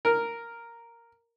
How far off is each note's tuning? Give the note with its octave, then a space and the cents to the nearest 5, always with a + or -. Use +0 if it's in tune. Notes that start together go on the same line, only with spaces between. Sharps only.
A#4 -5